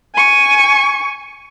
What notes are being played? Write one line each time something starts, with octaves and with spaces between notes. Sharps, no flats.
G#5 C#6